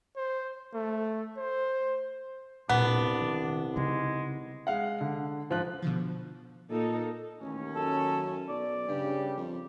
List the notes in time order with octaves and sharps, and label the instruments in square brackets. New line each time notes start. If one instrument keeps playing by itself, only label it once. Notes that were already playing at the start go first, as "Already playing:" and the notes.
[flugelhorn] C5
A3
C5
[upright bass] E1 A#2 [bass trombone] C2 [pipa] B3 [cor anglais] D4
[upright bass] D#3
[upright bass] C#3 D#4 [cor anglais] G#3
[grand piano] G#3 F5 F#5
D3
G#2 F3 F4 F#6 F#7
[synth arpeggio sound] B2 D3 F3
[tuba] A#2 [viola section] A#3 D#4 A4
[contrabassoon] A1 [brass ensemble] D#2 C#4
[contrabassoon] F#2 [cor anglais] A4
[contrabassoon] B1 [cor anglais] D5
[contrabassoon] G2 [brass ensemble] C#3 G3 G4
[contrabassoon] F2